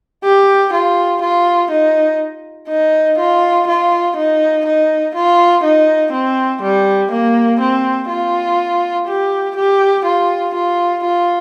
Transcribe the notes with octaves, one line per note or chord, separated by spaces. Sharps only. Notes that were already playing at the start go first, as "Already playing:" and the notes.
G4
F4
F4
D#4
D#4
F4
F4
D#4
D#4
F4
D#4
C4
G3
A#3
C4
F4
G4
G4
F4
F4
F4